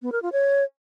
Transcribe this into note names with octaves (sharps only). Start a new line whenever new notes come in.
B3
A#4
F4
C#5